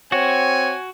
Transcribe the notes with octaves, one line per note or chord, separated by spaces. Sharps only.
C4 F#4 C#5 G#5